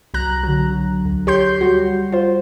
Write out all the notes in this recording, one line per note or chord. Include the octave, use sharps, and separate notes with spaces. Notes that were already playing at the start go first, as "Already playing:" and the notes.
C2 F#3 A#5 F#6
D3 F#3
D2
G4 C#5 C6 G6 C7
G3 F#4
F4 C5